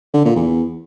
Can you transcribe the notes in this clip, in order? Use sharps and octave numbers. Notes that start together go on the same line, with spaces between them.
D3
A#2
E2